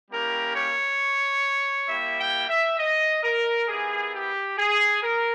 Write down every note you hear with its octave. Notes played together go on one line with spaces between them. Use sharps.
G3 A#3 C#4 E4 G4 A#4
C#5
G3 A#3 E4 G4 E5
G5
E5
D#5
A#4
B3 E4 G4 G#4
G4
G#4
A#4